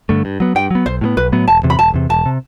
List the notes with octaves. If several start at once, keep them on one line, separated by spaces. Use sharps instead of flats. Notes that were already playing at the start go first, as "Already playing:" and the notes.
G2 D3 A3
G2
F#3 B3
G2 G5
F#3 B3
B1 C5
A2 F#3 B3
B1 B4
A2 F#3 B3
E1 A5
E2 C3
B5
E1 A5
E2 C3
E1 A5
C3